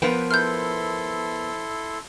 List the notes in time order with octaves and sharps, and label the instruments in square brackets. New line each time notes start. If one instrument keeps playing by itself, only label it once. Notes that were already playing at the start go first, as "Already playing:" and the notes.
[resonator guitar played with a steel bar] F3 B4 [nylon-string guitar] B3 A#4 G5
[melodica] E4 A4 C6 [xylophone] F6 G6